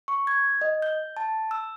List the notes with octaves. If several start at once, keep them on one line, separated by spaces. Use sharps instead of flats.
C#6
G#6
D#5
G6
A5
E6